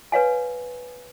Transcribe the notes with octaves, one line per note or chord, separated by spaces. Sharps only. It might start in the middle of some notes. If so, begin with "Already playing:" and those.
B4 C#5 F5 G#5